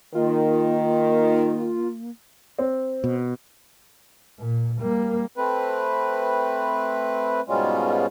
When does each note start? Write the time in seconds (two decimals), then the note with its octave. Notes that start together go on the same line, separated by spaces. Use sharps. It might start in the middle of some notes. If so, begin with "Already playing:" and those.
0.15 D#3 A#3 F4
2.59 C4
3.04 B2
4.39 A#2
4.81 G3 A#3
5.36 A3 C4 B4
7.48 G#2 B2 G3 G#3 C#4 F4